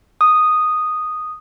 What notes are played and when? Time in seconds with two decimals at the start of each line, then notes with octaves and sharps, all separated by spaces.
0.21 D#6